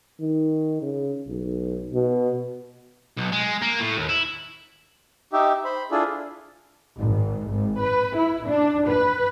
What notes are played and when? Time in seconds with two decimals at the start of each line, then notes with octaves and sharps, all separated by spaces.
0.20 D#3
0.82 C#3
1.28 B1
1.93 B2
3.18 B1
3.32 G#3
3.62 A#3
3.80 A2
3.97 D#2
4.09 E4
5.33 D#4 G4 E5
5.65 C5 B5
5.91 D4 E4 F4 G#4 A4
6.98 G#1
7.50 G#1
7.81 B4
8.15 E4
8.47 D4
8.89 B4